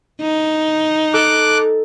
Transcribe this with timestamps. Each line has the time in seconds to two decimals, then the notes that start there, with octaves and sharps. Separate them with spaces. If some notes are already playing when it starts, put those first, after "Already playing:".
0.21 D#4
1.14 A4 D6 F#6